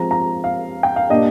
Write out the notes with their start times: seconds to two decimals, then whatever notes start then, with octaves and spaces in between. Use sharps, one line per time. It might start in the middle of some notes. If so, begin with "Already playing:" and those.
Already playing: F3 G#3 C4 A#5
0.11 A#5
0.44 F5
0.83 G5
0.96 F5
1.10 A#2 G3 A#3 D4 D#5